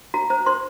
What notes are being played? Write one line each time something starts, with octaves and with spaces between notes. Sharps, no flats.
F#4 A#5
C5 A#5
C5 C6